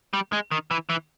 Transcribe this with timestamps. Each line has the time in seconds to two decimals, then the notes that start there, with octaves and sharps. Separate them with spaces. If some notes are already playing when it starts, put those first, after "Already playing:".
0.13 G3
0.33 G#3
0.52 D#3
0.71 E3
0.90 E3